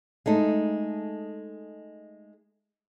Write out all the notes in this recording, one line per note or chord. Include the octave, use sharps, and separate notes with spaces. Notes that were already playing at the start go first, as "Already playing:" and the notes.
G#3 A3 D#4